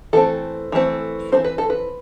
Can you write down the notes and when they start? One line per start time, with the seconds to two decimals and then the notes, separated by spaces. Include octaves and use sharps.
0.13 E3 A3 C4 A4
0.72 E3 A3 C4
1.32 A3 C4 C5
1.37 E3
1.44 B4
1.58 A4
1.70 B4